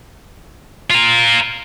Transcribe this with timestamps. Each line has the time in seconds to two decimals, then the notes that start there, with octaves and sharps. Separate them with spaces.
0.90 F4 A#4